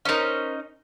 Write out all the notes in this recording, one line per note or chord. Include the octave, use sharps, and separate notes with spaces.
C#4 D#4 A#4 C5 D#5